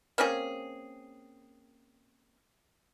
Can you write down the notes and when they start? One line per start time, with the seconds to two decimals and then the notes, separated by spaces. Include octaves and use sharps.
0.18 A#3 C4 C#4 G#4